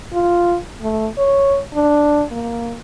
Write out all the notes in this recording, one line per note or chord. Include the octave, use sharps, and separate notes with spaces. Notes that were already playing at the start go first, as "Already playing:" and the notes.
F4
A3
C#5
D4
A#3